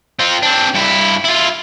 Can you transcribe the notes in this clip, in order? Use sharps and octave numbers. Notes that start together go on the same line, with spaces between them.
C4 F4
C4 D4
G2 E4
E4 F4